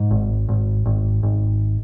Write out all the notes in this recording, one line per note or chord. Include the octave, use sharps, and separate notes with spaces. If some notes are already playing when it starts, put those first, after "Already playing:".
Already playing: G#2
G#1
G#1
G#1
G#1